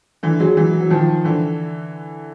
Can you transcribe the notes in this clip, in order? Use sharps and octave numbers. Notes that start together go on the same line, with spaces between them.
D3 E3
F#3 G#3
E3 F#3
F#3
D#3 F3
D3 E3